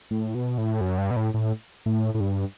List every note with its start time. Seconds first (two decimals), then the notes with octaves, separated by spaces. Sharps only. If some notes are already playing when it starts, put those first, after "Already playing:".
0.11 A2
0.35 B2
0.58 A2
0.81 F#2
0.98 G2
1.11 B2
1.16 A2
1.34 A2
1.86 A2
2.14 A2
2.20 G2